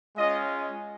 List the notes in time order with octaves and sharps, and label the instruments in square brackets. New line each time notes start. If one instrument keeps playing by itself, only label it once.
[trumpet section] G#3 C#4 F4 D#5